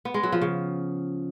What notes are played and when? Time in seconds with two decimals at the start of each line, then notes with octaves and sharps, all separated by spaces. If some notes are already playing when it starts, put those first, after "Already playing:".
0.05 B3
0.14 G#3
0.23 F#3
0.32 F3
0.42 C#3